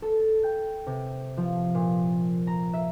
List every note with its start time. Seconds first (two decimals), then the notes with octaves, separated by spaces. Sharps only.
0.02 A4
0.43 G5
0.87 C3
1.37 F3
1.75 A#2
2.47 A#5
2.74 E5